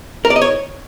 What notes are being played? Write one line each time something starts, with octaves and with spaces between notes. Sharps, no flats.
A#4
D5
D#5
C#5